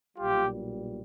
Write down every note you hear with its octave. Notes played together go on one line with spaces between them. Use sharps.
B1 A#2 G3 F4 G4